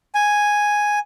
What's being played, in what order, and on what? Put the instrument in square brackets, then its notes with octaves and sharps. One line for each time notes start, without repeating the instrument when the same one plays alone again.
[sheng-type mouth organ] G#5